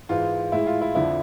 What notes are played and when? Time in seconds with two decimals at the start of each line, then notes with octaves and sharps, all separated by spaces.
0.09 G#2 E3 G#3 F4
0.52 A2 G#3 E4
0.67 F4
0.81 E4
0.95 F2 D3 F3 E4